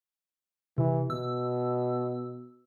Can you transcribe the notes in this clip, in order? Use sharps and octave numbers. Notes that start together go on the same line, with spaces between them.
C3 E3
B2 E6